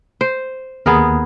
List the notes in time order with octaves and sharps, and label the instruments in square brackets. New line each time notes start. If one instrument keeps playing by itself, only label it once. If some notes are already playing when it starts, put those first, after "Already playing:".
[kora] C5
[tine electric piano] D#2 [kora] B3 G#4 A#4